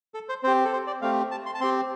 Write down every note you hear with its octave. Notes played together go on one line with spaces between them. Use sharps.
A4
C5
C4 G4 C5
A4
C5
D5
A3 C4 G4 F5
A5
C6
A5
C4 G4 C6